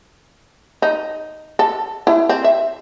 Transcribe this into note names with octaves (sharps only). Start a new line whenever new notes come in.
D#4
A4
E4
C4
E5